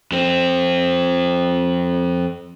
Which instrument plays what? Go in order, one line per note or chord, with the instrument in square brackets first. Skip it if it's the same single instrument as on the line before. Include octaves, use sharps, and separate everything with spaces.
[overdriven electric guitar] F2 C4